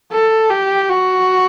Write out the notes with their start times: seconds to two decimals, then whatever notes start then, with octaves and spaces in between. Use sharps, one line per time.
0.12 A4
0.50 G4
0.89 F#4